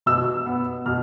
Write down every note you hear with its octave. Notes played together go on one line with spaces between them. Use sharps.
B2 E6
B3
B2 F6